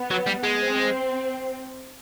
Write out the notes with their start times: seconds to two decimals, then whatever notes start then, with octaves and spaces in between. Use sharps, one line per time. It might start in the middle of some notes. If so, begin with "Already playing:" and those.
Already playing: B3
0.11 F#3
0.26 G3
0.43 G#3
0.61 C4